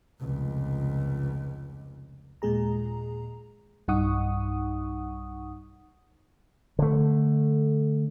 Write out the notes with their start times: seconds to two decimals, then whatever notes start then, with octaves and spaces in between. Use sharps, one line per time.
0.20 F1 C#2
2.42 D#2 A#2 G#3 G#4 A#5
3.88 B1 G2 D#4 F#5 C#6 D#6
6.79 D3 A3